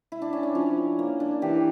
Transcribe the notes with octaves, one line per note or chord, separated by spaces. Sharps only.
E4
D4
C#4
D4
F3 C#4
A#3
D4
E3 G4